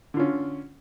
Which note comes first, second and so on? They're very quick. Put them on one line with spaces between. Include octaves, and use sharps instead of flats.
D3 F4 C#4